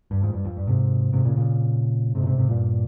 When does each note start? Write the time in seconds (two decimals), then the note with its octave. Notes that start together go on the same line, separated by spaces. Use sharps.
0.11 G2
0.23 F2 G#2
0.33 G2
0.45 F2
0.57 G2
0.67 G#2 C3
1.13 G#2 C3
1.25 A#2 C#3
1.36 A#2 C#3
2.15 G#2 C3
2.23 A#2
2.26 G#2 C3
2.38 G#2 C3
2.48 G2 A#2